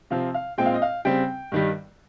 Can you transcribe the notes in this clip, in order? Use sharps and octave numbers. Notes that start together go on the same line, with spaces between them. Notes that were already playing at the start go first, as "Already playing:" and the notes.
C3 F3 C4 F5
F5
A#2 G#3 C4 G5
F5
D#5
F5
C#3 G3 C4 G5
G2 D#3 G3